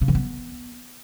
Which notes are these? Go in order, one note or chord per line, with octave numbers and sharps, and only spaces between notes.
C#3
E3
B3